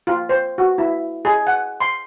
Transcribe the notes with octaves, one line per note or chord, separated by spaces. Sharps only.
F4
C5
F#4
E4
G#4
F#5
C6